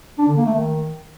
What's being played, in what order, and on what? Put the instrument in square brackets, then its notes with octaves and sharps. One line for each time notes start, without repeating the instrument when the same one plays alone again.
[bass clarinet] D4
D3
A#3
A3
D#3